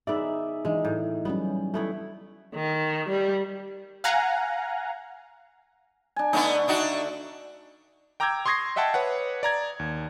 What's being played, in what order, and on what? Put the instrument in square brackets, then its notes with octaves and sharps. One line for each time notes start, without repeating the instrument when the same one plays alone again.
[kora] B3 D5 [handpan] D#4 G#4 E5
[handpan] E3 D4 D#4 [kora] G#3
[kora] A2
[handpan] F#3 G3 C#4 [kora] B3
[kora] A3 B3 E4
[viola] D#3
G3
[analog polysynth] F5 F#5 G#5 A#5
[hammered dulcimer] D4 G#5
[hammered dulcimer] D3 A3 [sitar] B3 D4 D#4
[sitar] D4 D#4 F#4
[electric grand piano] G5 A#5 D6 E6 G6 G#6
C6 C#6 D#6 G#6 A#6 C7
D#5 E5 F#5 G5 A5
B4 C#5 F#5
D5 A#5 G#6
D#2